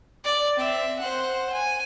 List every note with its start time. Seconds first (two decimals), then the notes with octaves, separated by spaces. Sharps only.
0.24 D5
0.57 C4 E5
0.99 C5 F#5
1.52 G#5